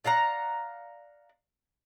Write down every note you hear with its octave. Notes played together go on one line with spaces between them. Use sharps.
D5 F5 F#5 A#5